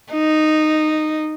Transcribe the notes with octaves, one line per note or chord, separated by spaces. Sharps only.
D#4